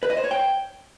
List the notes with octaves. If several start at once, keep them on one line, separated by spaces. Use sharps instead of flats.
B4
D#5
C5
C#5
G5